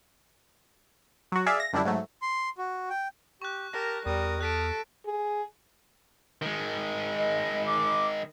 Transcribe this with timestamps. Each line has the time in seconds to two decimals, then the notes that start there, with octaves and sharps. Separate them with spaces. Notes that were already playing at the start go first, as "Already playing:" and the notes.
1.32 F#3 F#4
1.46 G#4 D5 E5 F5
1.60 A#6
1.73 F#2 D3 G3 D4 E4
1.85 G#2 F#3 A3
2.22 C6
2.58 F#4
2.90 G5
3.42 G4 C#6 F#6
3.73 G4 A#4 A5 A#6
4.06 E2 G3 A#4 D#6
4.41 A4 D#6 F6 F#6 B6 D7
5.06 G#4
6.42 D#3 G#3
7.18 D#5
7.66 D6